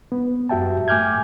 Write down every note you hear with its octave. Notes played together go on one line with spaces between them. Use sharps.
B3
F#2 F#4 G4 E5 G5 A5
A3 G#5 D6 F6 G6 G#6